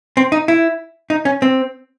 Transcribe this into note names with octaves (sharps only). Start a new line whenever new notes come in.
C4
D#4
E4
D#4
C#4
C4